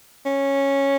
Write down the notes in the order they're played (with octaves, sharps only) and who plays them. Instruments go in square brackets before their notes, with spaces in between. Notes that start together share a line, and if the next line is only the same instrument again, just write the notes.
[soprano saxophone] C#4